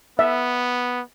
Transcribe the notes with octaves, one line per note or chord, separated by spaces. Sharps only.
B3 E5